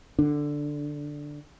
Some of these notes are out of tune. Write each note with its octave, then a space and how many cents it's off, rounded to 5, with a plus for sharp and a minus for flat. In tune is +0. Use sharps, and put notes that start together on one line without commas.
D3 +0 D4 +0